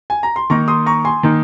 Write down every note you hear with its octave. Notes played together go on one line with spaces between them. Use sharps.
G#5
A#5
C6
D#3 A#3 D#4 A#5 C#6
C6 D#6
A#5 C#6
G#5 C6
D#3 A#3 D#4